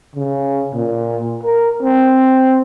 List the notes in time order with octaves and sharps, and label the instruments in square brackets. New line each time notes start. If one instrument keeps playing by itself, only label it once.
[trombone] C#3
A#2
A#4
C4